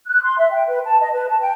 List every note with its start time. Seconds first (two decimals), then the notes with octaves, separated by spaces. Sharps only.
0.06 F#6
0.23 C6
0.38 E5
0.51 G5
0.68 B4
0.85 A5
1.00 D#5
1.13 B4
1.28 A5
1.40 G5